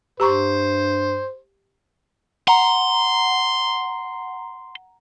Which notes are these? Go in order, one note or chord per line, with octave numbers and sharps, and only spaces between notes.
G2 G4 C5 A#5 C#6
F#5 A#5 C6